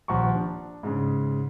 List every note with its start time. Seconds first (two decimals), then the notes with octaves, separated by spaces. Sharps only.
0.08 D#1 A#1 F3 F#5 A#5 C#6
0.36 D4
0.83 G#2 C#3